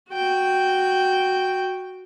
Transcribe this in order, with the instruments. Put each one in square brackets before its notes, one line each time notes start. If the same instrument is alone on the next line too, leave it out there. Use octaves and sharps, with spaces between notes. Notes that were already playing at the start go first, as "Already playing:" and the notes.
[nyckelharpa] F#4 G5